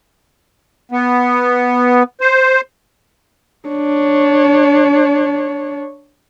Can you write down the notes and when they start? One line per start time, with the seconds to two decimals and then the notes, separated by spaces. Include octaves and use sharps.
0.92 B3
2.21 C5
3.69 D4 C#5